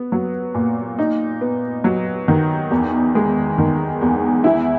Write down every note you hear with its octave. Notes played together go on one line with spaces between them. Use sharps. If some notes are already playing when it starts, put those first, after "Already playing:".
Already playing: B3
F#3
A#2
D#4
B3
F#3
D#3
E2
G#3
D#3
E2
E4